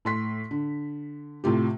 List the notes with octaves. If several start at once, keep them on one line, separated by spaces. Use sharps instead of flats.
A2 C6 B6
D3
A2 C3 F4 G4